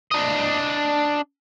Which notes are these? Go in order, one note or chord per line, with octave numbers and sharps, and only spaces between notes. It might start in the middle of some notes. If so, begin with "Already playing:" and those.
D4 D#5